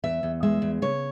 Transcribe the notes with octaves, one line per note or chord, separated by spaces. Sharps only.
E2 E5
E2
G#3 E5
E2
C#3 C#5